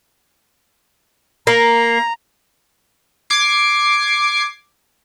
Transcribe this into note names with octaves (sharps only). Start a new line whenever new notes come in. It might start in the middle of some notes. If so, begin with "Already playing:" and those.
A#3 A#5
D6 G#6 C7